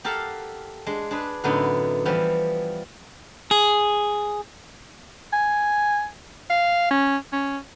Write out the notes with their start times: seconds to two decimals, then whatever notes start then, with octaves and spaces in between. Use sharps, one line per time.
0.04 G4 A4 A#4 F5 F#5 A5
0.86 G#3 D4
1.11 D4 G#4 B4
1.44 F#2 A2 D3 B3 D#4 E4
2.05 E3 F3 G3 B3
3.51 G#4
5.33 G#5
6.50 F5
6.91 C#4
7.33 C#4